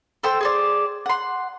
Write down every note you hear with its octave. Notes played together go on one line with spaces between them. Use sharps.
A4 C5 G5 E6
G#4 C5 D5
F#5 C6